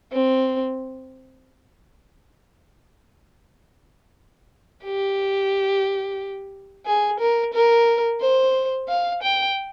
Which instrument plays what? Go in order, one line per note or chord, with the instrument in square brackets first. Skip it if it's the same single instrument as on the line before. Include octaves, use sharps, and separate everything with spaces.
[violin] C4
G4
G#4
A#4
A#4
C5
F5
G5